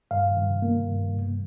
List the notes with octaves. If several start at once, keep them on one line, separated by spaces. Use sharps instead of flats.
G2 F5
G2
A#3
G2
G2